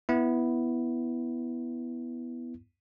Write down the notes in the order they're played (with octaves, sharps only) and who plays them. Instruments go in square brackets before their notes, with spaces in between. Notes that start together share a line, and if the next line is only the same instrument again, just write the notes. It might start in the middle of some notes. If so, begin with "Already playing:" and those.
[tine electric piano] B3 E4